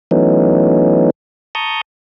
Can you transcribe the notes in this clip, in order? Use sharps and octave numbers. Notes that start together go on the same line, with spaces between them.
E3 F#3 A3 B3 C#4 D#4
A5 A#5 C#6 D#6 G6